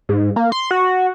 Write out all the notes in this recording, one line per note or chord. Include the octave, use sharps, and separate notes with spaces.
G#2
A#3
C6
F#4